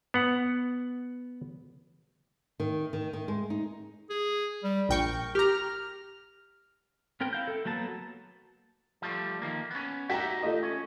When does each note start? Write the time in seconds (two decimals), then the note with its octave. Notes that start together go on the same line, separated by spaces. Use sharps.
0.14 B3 F#5
2.60 D#3
2.93 D#3
3.13 D#3
3.28 G#3
3.50 D#4
4.10 G#4
4.63 G3
4.89 A#1 A#4 G5 C#6
5.35 G4 A#5 F6
7.21 B3 C4 A#4 G5
7.33 E4 F5 G6
7.47 A4
7.65 F#3 A#3 B3 A5
9.02 F3 G3 A3
9.42 D#3 F3 A#3
9.71 B3 C#4
10.09 D#4 F#4 G4 E5 G5 A#5
10.43 A3 F4 D#5
10.63 C#4